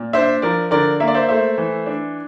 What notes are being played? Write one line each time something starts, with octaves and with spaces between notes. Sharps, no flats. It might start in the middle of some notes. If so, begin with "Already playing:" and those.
Already playing: A#2
D4 C5 E5
F3 A#4 D5
D3 A#4 D5
A#3 E5
D5
C5 E5
A3 C5 E5
E3
D4